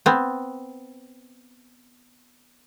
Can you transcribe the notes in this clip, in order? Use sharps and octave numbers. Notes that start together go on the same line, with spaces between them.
B3 C4